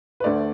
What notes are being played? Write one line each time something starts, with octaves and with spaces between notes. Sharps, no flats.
B4
D2 D3 A3 D5